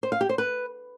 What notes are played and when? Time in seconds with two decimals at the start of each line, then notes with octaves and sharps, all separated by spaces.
0.03 C5
0.12 F5
0.21 G4
0.29 C5
0.38 B4